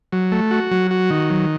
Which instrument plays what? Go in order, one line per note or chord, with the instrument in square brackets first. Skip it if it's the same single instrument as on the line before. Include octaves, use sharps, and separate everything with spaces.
[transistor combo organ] F#3
A3
F#4
F#3
F#4
D#3
F#3